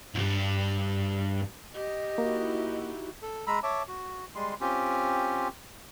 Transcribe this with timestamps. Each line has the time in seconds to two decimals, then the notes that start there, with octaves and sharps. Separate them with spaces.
0.15 C2 G2
1.74 G4 D#5
2.18 A#3 D#4 E4 F#4
3.22 A4
3.47 G#3 A#5 B5 E6
3.63 C#5 E5 A5 D6
3.88 F#4
4.35 G3 G#3 C6
4.61 C4 C#4 F4 G4